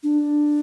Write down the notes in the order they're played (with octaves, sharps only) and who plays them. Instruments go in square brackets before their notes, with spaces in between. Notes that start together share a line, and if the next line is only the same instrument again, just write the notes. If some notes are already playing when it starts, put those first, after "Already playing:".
[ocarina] D4